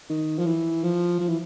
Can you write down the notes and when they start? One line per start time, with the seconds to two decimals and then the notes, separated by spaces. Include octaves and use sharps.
0.10 D#3
0.39 F3
0.46 E3
0.84 F3
1.20 F3
1.28 E3